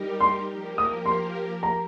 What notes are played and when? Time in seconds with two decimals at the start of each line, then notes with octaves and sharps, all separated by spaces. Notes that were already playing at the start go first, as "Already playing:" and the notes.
Already playing: G3 D#4 G4 A#4
0.20 C6
0.50 F3 A#3 G4 A#4
0.78 D#6
1.06 C6
1.63 A#5